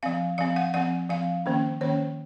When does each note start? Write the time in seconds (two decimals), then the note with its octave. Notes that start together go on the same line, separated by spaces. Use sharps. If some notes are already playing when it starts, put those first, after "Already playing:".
0.03 F3 C4 F5
0.38 F3 C4 F5
0.56 F#5
0.74 F3 C4 F#5
1.09 F3 C4 F5
1.46 D#3 A#3 C#4
1.81 D#3 A#3 C#4 C#5